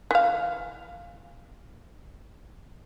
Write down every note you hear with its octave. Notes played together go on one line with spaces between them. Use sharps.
E3 F5